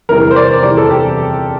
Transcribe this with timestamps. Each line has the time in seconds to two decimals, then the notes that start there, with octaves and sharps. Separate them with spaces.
0.09 E2 C3 E3 G3 A#4
0.31 C5
0.36 D5
0.63 E2 C3 E3 G3 D5
0.77 A4
0.90 G4